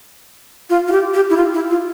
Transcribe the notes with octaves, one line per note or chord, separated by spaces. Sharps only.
F4
F4
G4
G4
E4
F4
E4
F4